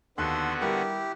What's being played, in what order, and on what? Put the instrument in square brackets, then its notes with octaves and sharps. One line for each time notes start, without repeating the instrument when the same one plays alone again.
[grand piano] D#2 F#6 [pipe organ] D3 B3 F#4 [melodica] A4 C6
[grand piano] G3 A#4 F#6 [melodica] E4 G4